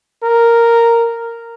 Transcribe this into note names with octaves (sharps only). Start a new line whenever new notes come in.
A#4